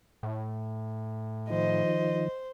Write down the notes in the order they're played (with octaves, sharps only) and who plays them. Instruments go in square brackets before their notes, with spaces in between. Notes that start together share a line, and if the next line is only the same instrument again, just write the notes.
[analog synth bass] A2
[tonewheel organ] D#3 F3 [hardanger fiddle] C5 [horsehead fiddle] D#5